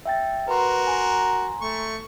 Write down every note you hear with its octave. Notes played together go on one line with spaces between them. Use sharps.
E5 G5 A6
F#4 A#4 B4 C6
G#5 A#5 C6
A3 C#6